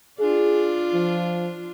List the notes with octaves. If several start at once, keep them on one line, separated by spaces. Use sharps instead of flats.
D4 F4 G#4
F3